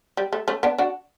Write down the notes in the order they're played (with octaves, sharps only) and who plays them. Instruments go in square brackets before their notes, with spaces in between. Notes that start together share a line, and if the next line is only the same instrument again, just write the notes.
[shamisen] G3
A3
A3 C#4
B3 D4
D4 F#4